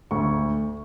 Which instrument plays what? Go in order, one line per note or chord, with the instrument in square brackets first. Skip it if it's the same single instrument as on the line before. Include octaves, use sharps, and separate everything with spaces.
[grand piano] D2 C#6